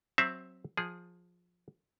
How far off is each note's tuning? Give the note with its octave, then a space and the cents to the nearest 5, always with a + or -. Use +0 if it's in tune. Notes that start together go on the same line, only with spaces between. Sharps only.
F#3 +0 C4 +10 E5 +0
F3 +15 G#4 +0